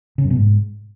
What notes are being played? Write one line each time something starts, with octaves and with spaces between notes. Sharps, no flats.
C#3
F#2
B2
G#2